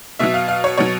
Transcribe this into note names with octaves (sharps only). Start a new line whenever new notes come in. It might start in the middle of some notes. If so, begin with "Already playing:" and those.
B2 F#3 E5
F5
F5
C#5
B2 F#3 C#5